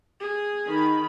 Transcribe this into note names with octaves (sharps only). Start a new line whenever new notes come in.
G#4
D#3 B5